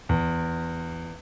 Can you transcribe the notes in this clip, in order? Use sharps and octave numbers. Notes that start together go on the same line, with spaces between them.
E2